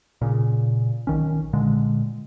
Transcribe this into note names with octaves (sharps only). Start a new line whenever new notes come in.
A#2 C#3
B1 D#3 C#4
A#2 D3 G#3